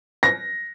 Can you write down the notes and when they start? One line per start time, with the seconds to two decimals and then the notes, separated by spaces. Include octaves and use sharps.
0.23 A#6